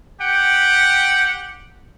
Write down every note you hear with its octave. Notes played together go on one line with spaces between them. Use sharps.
G4 F#5 G5